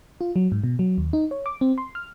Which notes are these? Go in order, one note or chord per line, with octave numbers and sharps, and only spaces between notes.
F4
F#3
G#2
B2
F#3
D#2
D#4
C#5
D6
C4
C6
F6